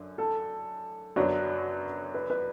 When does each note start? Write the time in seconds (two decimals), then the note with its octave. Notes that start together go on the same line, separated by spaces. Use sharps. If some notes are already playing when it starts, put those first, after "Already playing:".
Already playing: F#2 D3
0.18 A4
1.16 F#2 D3 F#3 B3 D4 C#5
2.14 B4
2.30 B4